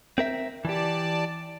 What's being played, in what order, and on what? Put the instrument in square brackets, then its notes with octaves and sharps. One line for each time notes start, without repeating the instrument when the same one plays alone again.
[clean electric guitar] C4 A#4 E5
[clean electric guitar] E3 G4 [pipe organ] D5 A5